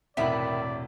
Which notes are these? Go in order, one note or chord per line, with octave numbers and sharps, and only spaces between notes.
E1 A2 C3 D#3 B3 D5 E5 B5